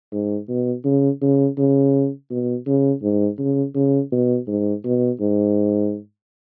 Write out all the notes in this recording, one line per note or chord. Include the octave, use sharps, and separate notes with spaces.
G#2
B2
C#3
C#3
C#3
B2
C#3
G#2
C#3
C#3
B2
G#2
B2
G#2